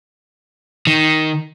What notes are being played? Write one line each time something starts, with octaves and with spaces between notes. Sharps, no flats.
D#3